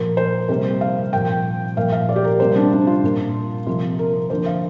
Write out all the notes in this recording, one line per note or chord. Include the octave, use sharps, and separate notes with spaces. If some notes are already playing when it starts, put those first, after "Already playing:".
Already playing: A#2 F3 A#3 A#4
C5
C3 G3 A#3 C5
F5
A#2 F3 A#3 G5
A#2 F3 A#3 F5
F5
D5
G4
A#4
C3 G3 A#3 C5
D4
D4
F4
A#2 A#3
C3 F3 A#3 F4
A#4
D3 F3 A#3 C5
F5